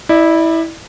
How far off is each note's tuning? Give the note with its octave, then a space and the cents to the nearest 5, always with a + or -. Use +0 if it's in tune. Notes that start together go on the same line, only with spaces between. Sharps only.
E4 -15 D5 +30